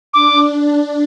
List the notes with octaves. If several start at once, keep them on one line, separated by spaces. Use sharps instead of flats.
D4 D6